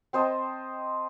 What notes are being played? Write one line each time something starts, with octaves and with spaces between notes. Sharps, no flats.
C4 C5 D#5 A5